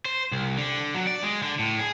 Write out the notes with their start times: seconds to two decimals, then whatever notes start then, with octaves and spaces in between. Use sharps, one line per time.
0.05 C5
0.32 C2
0.57 D3
0.95 F#3
1.07 D5
1.23 G#3
1.43 D3
1.59 A2
1.79 G#4